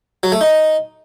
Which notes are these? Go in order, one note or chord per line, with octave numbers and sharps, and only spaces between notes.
F#3
A3
D#4